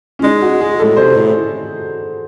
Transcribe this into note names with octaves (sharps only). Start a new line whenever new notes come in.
C#4
G#3 D#4
F#4
G#4
A2 A4
C3 C5
A2